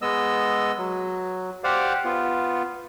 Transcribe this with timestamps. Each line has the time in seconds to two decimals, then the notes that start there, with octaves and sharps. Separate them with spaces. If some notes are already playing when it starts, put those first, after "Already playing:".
0.02 G#3 B3 D#5 E6
0.78 F#3
1.64 G4 C5 D5 F5 F#5
2.05 B3 F4